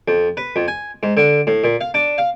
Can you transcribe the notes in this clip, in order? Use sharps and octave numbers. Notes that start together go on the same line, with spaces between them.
F2
B4
F2
G#5
G#2
D3
A2
A#2
F5
D4
F5